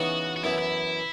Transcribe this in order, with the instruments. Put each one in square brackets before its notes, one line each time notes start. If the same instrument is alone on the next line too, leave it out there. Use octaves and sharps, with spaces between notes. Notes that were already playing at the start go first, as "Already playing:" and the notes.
Already playing: [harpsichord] C#3 E3 B3 D#4 [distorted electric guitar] F#4
[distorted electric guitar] F#4
[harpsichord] F#2 E3 B3 [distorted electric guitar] E4
[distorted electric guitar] E4